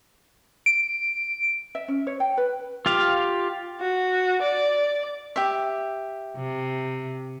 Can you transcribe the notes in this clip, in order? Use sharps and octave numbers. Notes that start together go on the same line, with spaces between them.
D7
E5
C#4
C#5
G5
B4
F4 G4 F5
F#4
D5
G4 E5
C3